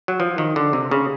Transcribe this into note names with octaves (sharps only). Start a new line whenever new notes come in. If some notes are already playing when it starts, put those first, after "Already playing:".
F#3
F3
D#3
D3
C3
C#3